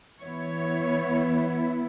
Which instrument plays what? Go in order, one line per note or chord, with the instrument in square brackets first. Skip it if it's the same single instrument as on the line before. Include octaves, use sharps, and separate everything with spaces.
[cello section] E3 B3 E4 C#5